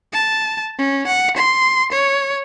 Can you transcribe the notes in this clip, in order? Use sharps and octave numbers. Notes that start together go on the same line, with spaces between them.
A5
C#4
F#5
C6
C#5